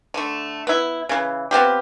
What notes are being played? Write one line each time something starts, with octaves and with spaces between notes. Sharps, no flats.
D3 A3
B3 E4
C#3 E3
B3 C4 F4 G4